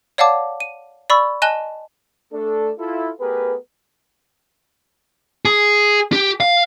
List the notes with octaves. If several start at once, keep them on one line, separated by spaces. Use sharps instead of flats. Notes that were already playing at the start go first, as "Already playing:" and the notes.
C#5 D5 F5 F#5 A5 D6
D#7
D5 B5 C#6 E6
D#5 G#5 A5 F#6 E7 G7
A3 D4 A4
E4 F4 A4
A3 B3 G4 G#4 A#4 B4
G#4
G4
F5